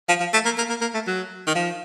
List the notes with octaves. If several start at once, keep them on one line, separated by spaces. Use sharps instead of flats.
F3
F3
A3
A#3
A#3
A#3
A#3
A3
F#3
D#3
F3